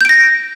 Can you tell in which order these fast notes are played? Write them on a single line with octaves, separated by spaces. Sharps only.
G6 D7 A#6